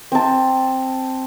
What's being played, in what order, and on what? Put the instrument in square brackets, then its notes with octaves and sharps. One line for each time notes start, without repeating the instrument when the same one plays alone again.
[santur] C4 A5